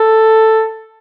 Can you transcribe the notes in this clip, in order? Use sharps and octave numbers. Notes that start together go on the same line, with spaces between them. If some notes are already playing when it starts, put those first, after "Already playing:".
Already playing: A4